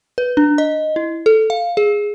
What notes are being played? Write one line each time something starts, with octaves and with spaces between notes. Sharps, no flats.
B4
D4
D#5
E4
A4
F5
G#4